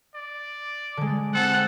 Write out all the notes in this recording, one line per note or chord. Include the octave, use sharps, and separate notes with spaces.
D5
D3 G#3
C4 A4 F#5